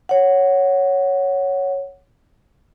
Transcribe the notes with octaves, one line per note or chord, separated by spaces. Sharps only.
C#5 F#5